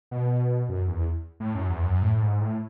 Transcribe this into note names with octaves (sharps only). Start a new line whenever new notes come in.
B2
F#2
E2
A2
F#2
E2
F#2
A2
G#2
A2